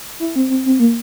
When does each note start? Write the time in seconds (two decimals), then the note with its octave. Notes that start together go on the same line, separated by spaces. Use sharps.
0.20 E4
0.36 C4
0.50 C4
0.66 C4
0.80 A#3